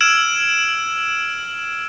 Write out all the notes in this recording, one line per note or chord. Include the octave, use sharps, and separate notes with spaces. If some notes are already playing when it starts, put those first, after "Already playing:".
E6 F6 G#6 D7 E7 F#7